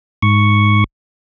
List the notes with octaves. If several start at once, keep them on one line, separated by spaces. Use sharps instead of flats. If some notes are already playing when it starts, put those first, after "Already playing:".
G#2 C#6